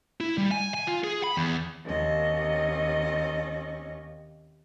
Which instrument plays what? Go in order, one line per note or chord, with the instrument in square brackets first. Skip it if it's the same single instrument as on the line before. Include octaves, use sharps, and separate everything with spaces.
[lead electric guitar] E4
G3
G#5
G#5
F4
G#4
B5
E2
[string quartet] D#2 C3 C#4 D#5